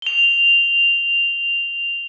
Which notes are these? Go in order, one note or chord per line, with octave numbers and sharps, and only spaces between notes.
F7 G7